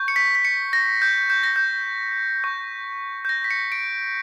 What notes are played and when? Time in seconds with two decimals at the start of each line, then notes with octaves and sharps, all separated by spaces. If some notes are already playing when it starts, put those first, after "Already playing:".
Already playing: C#6 G6
0.08 C#7
0.16 B6
0.35 B6
0.45 C#7
0.73 A#6
1.02 G6
1.30 G6
1.43 A#6
1.56 G6
2.44 C#6 G6
3.25 G6
3.29 A#6
3.44 B6
3.50 C#7
3.72 D7